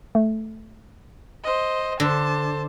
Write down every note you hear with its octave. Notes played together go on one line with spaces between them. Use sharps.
A3
C5 D#5
D3 C5 A5 A#6